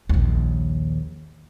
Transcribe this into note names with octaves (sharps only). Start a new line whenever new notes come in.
A#1 D#2